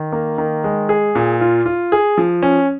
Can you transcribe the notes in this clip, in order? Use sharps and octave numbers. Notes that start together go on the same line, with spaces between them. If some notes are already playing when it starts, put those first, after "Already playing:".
Already playing: D#3
A#3
D#3
G#3
G#4
A#2
F4
F4
G#4
F3
C#4